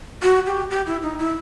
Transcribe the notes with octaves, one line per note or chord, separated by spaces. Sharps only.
F#4
G4
G4
E4
D#4
E4